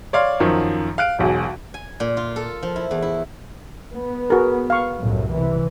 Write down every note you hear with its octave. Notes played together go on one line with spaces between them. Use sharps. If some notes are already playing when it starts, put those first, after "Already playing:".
C#5 D5 F5 C6
F#2 D#3 F3 F#3
F5 F#6 D7
E1 B1 G#4
G#5
A#2
F4
A4
F3
E4
E2
E4
B3
F#4 G#4 A#4
F5 C#6
C2 F#2 A2
C3 E3